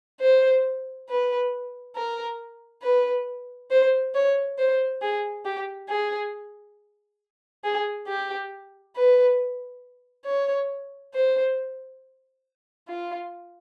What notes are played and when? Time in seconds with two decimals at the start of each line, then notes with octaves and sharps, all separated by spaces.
0.20 C5
1.09 B4
1.95 A#4
2.83 B4
3.71 C5
4.15 C#5
4.58 C5
5.02 G#4
5.45 G4
5.89 G#4
7.64 G#4
8.08 G4
8.95 B4
10.26 C#5
11.14 C5
12.88 F4